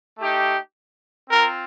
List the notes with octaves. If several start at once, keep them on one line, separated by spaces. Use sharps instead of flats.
A3 D#4 G4
C4 F4 A#4